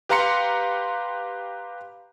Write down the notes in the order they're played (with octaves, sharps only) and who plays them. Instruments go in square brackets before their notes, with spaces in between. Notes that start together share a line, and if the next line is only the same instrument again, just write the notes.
[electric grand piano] G4 B4 F5 A#5 C6 C#7